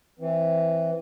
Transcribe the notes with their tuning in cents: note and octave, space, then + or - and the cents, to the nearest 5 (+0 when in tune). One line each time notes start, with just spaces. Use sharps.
E3 +0 C4 +0